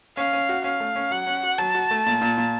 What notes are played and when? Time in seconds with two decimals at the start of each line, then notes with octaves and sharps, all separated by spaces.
0.17 C#4 F5
0.33 C#4
0.49 F#4
0.64 C#4 F5
0.80 A3
0.96 C#4
1.11 F#3 F#5
1.27 C#4
1.43 F#4
1.58 F#3 A5
1.75 F#4
1.91 A3
2.06 A#2
2.22 A#2
2.38 A#2